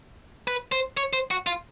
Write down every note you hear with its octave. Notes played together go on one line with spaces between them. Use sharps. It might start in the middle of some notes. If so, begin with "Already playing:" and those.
B4
C5
C#5
C5
F#4
F4